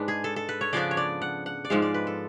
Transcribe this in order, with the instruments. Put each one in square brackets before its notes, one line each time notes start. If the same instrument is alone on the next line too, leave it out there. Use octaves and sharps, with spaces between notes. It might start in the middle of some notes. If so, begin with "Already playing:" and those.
Already playing: [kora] G#2 G#3 D4 B4
G#4
A4
A4
B4
C#5
C#3 F3 B3 D4 D5
C#5
D5
F#5
F#5
D5
G#2 F3 G#3 F5
D5
B4
A4